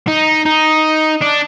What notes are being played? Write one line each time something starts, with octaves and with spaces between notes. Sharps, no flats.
D#4
D#4
D4